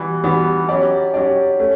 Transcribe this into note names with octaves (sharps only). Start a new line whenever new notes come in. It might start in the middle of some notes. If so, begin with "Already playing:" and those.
Already playing: E3 G3 B3 F#4
E3 G3 B3 F#4
F#3 C#4 G4 D5
F#3 C#4 G4 D5
A3 C#4